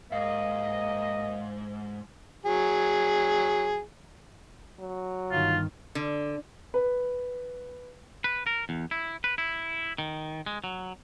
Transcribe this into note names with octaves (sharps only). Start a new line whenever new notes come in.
D#2 G#2 A#3 D#5 F5
F#3 G#4
F#3
G1 D#3 F4
D3
B4
B4
A#4
E2
E4
B4
E4
D#3
G#3
F#3